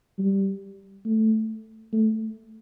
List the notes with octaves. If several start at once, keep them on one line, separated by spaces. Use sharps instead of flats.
G3
A3
A3